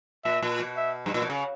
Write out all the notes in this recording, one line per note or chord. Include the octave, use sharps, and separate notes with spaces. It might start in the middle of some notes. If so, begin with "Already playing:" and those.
A#2 E5
A#2
B2
E5
G2
A#2
B2
C#3